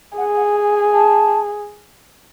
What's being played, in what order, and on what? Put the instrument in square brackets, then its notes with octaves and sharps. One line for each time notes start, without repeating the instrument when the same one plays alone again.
[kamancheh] G#4 [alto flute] F#5
[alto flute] F#5
G#5
G#5
A5